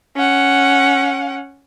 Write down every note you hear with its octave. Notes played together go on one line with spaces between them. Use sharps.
C#4 F#5